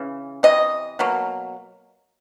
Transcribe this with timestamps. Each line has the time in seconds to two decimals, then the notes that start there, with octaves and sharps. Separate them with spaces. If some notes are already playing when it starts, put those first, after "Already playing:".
Already playing: C#3 E3
0.43 C3 E3 D#5
0.99 B2 F#3 A#3